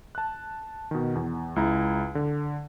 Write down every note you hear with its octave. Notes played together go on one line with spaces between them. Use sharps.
A5 F#6
B2 D#3
E2
C#2 E4 A#5
D3